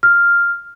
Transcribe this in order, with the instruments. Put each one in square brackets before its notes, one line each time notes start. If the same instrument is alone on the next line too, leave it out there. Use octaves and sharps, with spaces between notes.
[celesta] F6